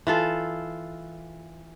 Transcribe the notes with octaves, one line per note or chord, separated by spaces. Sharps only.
E3 F4 A4